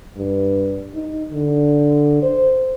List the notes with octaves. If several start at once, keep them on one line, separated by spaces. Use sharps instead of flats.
G2
D#4
D3
C5